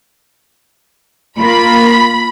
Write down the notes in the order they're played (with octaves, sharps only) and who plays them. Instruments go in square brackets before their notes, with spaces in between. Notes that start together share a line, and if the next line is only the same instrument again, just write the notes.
[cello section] A#3 F4 A#4 [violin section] B5